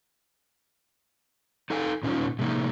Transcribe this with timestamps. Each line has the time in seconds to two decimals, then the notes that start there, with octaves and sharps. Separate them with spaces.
1.70 D#4 A4 F5 G5 G#5
2.03 A#2 C#4 D#4 F4
2.39 A2 C3 F3 A#3 D#4